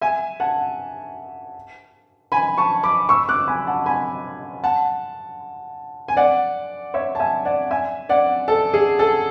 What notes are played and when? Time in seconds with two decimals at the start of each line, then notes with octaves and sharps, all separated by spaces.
0.01 E5 G#5
0.40 F#5 A5
2.32 G#5 B5
2.58 A5 C#6
2.83 B5 D6
3.09 C#6 E6
3.29 D6 F#6
3.48 G#5 B5
3.67 F#5 A5
3.86 G#5 B5
4.64 F#5 A5
6.08 G#5
6.17 D5 F#5
6.94 C#5 E5
7.15 A5
7.19 E5 G#5
7.45 D5 F#5
7.71 E5 G#5
8.09 D5 F#5
8.48 A4
8.74 G#4
8.99 A4